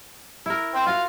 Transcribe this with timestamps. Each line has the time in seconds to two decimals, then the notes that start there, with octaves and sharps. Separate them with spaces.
0.46 E4 A#4
0.74 C5 G5
0.86 F4 F#4 F5